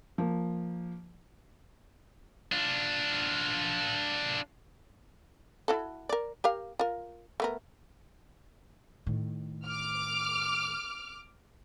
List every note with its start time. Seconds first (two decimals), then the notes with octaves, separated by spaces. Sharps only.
0.18 F3 A#3
2.52 D4 F4
5.68 E4 F#4 A4
6.09 A#4 D5
6.44 G4 A#4 F5
6.79 F4 A#4
7.40 A3 B3 A#4
9.06 A2 D#3
9.65 D6 F6